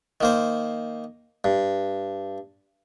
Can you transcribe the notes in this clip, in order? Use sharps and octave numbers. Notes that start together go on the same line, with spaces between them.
D#3 A#3 C5
G2